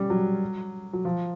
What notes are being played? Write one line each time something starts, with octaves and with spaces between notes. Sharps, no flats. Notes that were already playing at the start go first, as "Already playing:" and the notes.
Already playing: G3 C#4
F#3
F#3
F3